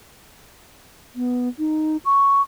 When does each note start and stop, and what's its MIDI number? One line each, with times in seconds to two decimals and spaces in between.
1.16 1.49 59
1.59 1.97 63
2.05 2.42 85